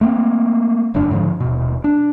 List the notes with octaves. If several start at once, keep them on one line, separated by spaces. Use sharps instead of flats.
A3 A#3 C4
E1 F#2 C#3 D4
G#2 D3 F3
D#1 B2
D4